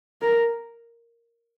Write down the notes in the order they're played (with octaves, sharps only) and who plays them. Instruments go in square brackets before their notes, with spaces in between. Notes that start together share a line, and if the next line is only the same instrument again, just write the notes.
[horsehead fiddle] A#4